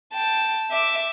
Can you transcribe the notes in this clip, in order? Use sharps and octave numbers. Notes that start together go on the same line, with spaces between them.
G5 A5
E5 D6